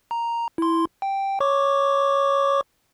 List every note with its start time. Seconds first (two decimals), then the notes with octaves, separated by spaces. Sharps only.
0.11 A#5
0.58 E4 C6
1.02 G5
1.40 C#5 C#6 D6